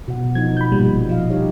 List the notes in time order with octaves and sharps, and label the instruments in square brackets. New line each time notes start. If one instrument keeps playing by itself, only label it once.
[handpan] B2 F#5
[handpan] F3 D#4 [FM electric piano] G#6
[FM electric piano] B5 G6
G1 A#2 G3
[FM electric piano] F3 [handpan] D#5 F5
[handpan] D#4 G4 C#5